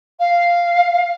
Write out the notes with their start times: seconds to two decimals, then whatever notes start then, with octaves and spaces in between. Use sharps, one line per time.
0.19 F5